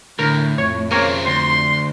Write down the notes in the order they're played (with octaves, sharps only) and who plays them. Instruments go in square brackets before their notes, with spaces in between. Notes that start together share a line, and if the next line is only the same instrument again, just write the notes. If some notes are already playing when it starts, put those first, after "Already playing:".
[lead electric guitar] A2 [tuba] D3 [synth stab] A#4
[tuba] F2 [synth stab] C#5
[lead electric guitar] C#3 C4 [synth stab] A#3 A#4 C#5
[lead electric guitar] D2 [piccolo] C6